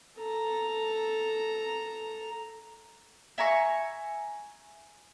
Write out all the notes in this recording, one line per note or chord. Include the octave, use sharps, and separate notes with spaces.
A4 A#5
E5 G#5 A#5 C#6